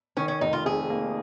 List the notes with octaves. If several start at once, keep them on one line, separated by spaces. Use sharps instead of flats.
D#3 C#4
C#4
F1 D#4
F4
F2 G#4
A#3